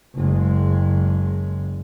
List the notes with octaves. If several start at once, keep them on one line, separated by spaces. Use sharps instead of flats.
F#1 G#3